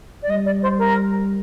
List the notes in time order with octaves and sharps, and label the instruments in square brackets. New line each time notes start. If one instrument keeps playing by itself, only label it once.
[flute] D5
[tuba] G3 [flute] D#5
[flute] D5
C5
A#4